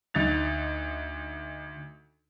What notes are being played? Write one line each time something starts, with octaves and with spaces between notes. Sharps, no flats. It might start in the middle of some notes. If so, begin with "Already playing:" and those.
D2 D#4 A6 F7